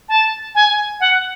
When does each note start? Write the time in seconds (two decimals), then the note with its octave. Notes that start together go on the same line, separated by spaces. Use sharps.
0.09 A5
0.55 G#5
1.00 F#5